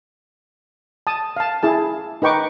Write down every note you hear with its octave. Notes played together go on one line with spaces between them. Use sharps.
A5 D#6
F5 A5
E4 G#4 A5
D#4 B4 G5 C#6 D6